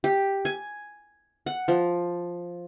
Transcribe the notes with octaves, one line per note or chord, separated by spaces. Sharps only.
G4
G#5
F#5
F3